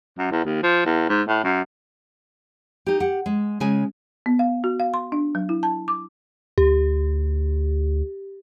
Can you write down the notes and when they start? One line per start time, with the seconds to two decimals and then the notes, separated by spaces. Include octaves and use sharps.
0.18 F#2
0.31 E2
0.44 D#2
0.63 F3
0.85 E2
1.09 G#2
1.28 A2
1.43 F#2
2.86 D#4 G4
3.00 G4 F#5
3.26 G#3
3.60 C#3 G#3 G#5
4.26 B3
4.39 F5
4.64 F#4
4.80 F5
4.94 C6
5.12 D4
5.35 F#3
5.49 E4
5.63 A5
5.88 D6
6.58 D2 G4